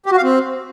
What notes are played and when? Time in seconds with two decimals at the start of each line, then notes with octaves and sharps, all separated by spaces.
0.06 G4
0.12 F#4
0.17 F5
0.23 C4